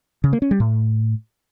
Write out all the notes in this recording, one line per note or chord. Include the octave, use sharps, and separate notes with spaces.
C#3
A#3
C#4
G3
A2